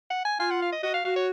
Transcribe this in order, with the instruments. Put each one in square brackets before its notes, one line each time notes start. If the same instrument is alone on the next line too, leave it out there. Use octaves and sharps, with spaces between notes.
[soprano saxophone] F#5
G#5
[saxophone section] F4 [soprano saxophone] G#5
[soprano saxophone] F#5
F5
D#5
[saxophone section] F#4 [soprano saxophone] D#5
[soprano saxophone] F5
[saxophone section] F#4 [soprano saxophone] F5
[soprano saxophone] C#5